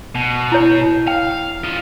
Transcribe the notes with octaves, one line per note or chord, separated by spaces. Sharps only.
B2
E4 C#5
F5 G5
F4 D#5